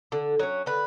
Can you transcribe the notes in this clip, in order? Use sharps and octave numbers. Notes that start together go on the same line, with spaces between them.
D3
F#3 C#4
D3 B4